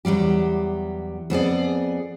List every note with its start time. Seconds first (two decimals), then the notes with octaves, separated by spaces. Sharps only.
0.05 E2 F#3 G3 G4
1.30 F2 B3 G#4 D5